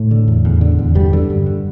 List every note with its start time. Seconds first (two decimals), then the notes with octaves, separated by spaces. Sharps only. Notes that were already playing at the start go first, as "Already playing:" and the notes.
Already playing: A2 A3
0.11 D3
0.28 E2
0.45 E2
0.61 D3
0.79 E2
0.95 G2 D3 G3
1.13 D3
1.30 G2
1.46 D3